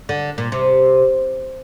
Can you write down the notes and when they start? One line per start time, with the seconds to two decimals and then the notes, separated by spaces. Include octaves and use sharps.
0.09 D3
0.38 A#2
0.52 C3